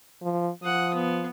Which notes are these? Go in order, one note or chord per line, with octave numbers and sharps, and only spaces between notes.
F3
F3 F#5 D#6
B3